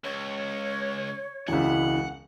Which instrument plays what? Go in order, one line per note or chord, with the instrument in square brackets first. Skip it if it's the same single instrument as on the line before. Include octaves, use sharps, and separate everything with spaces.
[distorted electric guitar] C#2 [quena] C#5
[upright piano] E1 C#2 [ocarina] E4 [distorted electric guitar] F#5